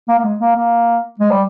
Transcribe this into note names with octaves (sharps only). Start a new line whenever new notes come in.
A#3
A#3
G#3
A#3
A#3
G#3
G3